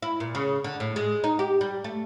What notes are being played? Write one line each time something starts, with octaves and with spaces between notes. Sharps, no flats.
E4
A#2
C#3
D3
A2
G#3
D#4
G4
G3
A3